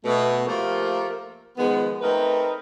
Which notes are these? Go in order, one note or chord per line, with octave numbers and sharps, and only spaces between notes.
B2 A3
F3 A3 A#3 F4 G4 A#4
D#3 F3 G#3 B3
A3 C4 D#4 A#4 B4